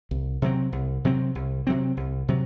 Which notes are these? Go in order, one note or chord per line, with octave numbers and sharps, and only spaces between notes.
C2
C3 F#3 C4
C2
C3 F#3 C4
C2
C3 F#3 C4
C2
C3 F#3